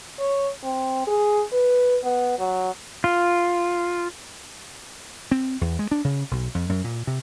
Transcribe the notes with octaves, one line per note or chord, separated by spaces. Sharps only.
C#5
C4
G#4
B4
B3
F#3
F4
C4
E2
G#3
D4
C#3
B1
F2
F#2
A#2
C3